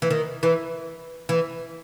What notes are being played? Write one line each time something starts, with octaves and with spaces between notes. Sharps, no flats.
E3
D#3
E3
E3